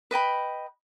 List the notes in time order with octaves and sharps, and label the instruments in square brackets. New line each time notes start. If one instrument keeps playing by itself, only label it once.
[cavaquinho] B4 D#5 G5 B5